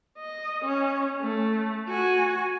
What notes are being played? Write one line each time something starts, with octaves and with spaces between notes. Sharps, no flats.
D#5
C#4
A3
F#4 G#5